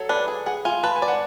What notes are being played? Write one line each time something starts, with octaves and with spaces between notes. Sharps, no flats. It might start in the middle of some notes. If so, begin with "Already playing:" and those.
Already playing: F#3 A4
D4 B4
G#4
G#4 F#5
F4 G#5
B4 A5
G#5
D5
F#5